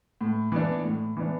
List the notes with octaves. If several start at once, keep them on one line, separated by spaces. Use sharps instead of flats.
A2
E3 B3 D4
A2
E3 B3 D4